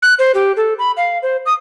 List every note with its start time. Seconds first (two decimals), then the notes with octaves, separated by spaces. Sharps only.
0.02 F#6
0.19 C5
0.34 G4
0.57 A4
0.79 B5
0.97 F5
1.22 C5
1.46 D#6